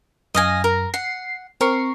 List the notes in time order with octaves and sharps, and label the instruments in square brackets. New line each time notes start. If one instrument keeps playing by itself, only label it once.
[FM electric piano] F#2 A#6 [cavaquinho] D#5 F5 G#5
[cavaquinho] A#4
[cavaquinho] F#5 [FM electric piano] C7
[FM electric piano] C4 C#6 C7 [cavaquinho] A#4